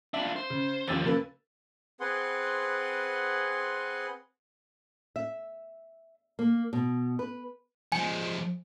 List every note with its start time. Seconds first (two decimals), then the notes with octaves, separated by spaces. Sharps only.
0.14 D4 F4 E5
0.36 C5
0.50 C#3
0.88 D#2 D3 F3 E6 A6
1.04 C#3 A#3 B4
2.00 C4 G#4 B4 F#5 C6
5.16 E5
6.39 A#3
6.73 B2
7.19 B4
7.92 F3 G#3 G#5